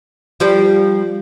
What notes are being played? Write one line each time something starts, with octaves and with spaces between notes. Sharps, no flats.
F3 G3 G4